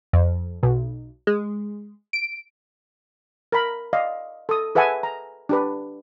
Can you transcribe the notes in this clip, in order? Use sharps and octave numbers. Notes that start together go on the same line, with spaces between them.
F2
B1
G#3
D7
A#4 A#5 B5
D5 D#5 F5
A4 D#6
G#4 B4 E5 F#5 G#5 A5
A#5
D4 G4 B4